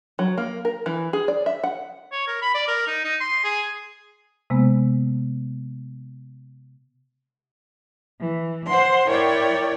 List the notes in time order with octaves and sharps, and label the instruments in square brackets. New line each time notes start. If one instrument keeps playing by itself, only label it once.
[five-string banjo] F#3
A#3
A#4
E3
G#4
D5
E5
F#5
[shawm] C#5
A#4
B5
D5
A#4
D#4
D#4
C6
G#4
[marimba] C3 G#3 A#3 B3
[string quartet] E3
C5 F#5 C6
E4 A#4 C#5 D5 G5